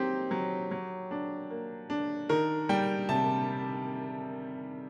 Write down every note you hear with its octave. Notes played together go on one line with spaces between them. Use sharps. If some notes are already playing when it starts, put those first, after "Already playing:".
Already playing: F#3 C4 D#4 G4
F#3
F#3
D4
A#3
D4
D#3 A#4
G3 G5
C3 A5